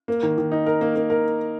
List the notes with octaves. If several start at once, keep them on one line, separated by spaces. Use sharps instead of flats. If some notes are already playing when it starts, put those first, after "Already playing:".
A#3
D#3
D#3
D#4
A#4
A#3
A#3
A#4